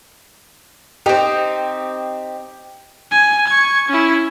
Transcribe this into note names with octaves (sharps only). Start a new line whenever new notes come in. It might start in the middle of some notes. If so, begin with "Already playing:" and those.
C4 D#4 G4
G#5
C#6 G#6
C#4 E4